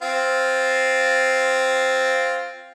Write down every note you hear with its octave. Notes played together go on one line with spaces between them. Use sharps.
C4 F4